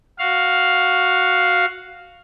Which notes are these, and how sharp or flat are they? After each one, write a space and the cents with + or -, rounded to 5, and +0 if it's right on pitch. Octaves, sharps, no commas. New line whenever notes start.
F#4 +0 F5 +5